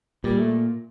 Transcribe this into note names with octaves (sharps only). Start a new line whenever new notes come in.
A#2 G3
A3